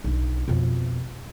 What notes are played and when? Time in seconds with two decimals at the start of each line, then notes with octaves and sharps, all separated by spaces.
0.04 B1 D4
0.48 F2 B2